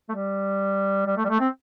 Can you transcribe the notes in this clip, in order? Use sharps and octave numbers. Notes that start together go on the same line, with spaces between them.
A3
G3
G3
A3
G3
A3
C4